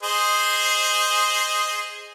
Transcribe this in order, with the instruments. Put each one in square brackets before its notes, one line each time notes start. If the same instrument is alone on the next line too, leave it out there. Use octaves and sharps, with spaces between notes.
[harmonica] G#4 C5 D#5